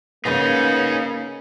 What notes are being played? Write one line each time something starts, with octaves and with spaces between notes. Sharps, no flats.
C#3 A#3 B3 D#4 G#4